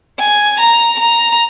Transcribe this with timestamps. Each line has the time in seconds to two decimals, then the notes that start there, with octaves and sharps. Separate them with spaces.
0.19 G#5
0.59 A#5
0.99 A#5